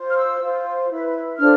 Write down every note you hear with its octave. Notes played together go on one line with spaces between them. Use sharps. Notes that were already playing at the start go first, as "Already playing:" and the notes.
Already playing: F4 C5
F6
E6
F4 C5
E4 B4
D4 F4 A4 C5 F6